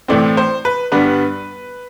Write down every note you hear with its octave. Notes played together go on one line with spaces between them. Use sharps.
A2 E3 A3 C4 D5
C5
B4
G2 D3 G3 B3 D4 B4